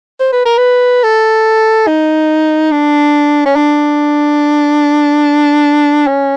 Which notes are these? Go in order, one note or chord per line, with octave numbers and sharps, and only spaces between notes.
C5
B4
A#4
B4
A4
D#4
D4
C#4
D4
C#4